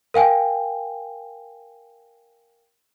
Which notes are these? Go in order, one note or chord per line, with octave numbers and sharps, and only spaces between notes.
A#4 F5 G5 G#5